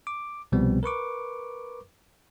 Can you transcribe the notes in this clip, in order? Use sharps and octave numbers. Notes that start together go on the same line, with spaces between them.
D6
C2 B2 F3 G3 B3 C4
A#4 B4 C#6 D6